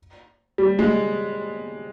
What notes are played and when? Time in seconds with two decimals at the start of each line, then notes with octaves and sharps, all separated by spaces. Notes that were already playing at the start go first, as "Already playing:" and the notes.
0.58 G3
0.79 G#3